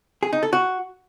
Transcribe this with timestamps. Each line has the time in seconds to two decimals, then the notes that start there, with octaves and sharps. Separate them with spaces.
0.23 G#4
0.33 D#4
0.43 A4
0.53 F#4